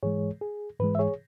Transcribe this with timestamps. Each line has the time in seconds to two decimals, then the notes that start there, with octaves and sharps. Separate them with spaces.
0.03 G#2 E3 G#3 G#4 C#5
0.41 G#4
0.80 G#2 E3 G#3 B4
0.95 E5
0.99 G#4 C#5